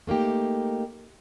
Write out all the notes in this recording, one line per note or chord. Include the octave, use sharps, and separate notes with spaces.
A3 A#3 D#4 G4